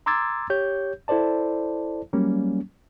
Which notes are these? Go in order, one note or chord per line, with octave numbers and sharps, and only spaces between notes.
A#5 C6 D6 E6 G#6 A6
G4 C#5 G6
E4 A4 C5 D5 A5
F#3 G3 A#3 C#4